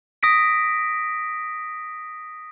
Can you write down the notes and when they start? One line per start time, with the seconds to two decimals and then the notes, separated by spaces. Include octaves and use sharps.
0.23 D#6 A#6 B6 D7